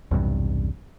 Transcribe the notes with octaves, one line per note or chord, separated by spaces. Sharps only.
B1 E2 G2 C3